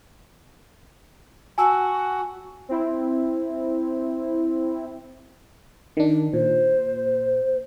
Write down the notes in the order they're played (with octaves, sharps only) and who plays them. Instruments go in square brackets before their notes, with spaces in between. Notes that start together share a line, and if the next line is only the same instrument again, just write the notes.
[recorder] F#4 [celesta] G#5 A5 E6
[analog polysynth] C4 E4
[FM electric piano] D#3 D4
[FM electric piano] A#2 [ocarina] C5